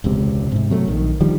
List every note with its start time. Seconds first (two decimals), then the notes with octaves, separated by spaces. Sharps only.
0.04 E1 C#2 C3
0.52 G#2 C3
0.70 C3 F#3 A3
0.87 A#1 D#3
1.20 D3 D#3 F3 G3